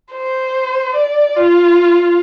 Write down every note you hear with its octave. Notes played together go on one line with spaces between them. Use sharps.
C5
D5
F4